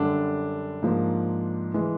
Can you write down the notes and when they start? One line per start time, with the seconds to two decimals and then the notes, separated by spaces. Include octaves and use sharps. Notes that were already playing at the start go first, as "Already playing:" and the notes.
Already playing: F#2 D3 G3 D4
0.83 G#2 F3 A#3
1.74 E3 G#3